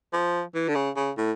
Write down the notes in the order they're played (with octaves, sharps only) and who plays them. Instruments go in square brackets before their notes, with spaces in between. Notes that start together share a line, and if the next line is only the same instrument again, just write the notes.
[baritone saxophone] F3
E3
D3
C#3
C#3
A2